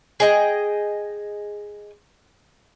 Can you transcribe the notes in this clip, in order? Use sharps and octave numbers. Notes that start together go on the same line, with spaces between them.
G#4 D#5 G5